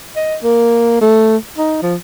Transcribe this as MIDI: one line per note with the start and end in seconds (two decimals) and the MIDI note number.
0.16 0.37 75
0.43 0.97 58
1.01 1.37 57
1.58 1.80 63
1.83 1.96 53